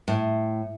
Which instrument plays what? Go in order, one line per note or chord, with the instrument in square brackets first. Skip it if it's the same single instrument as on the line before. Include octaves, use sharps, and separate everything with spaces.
[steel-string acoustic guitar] A2